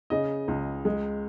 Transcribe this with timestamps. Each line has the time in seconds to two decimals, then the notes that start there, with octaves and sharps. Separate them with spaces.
0.10 C#3 D#5
0.48 C#2
0.85 G#3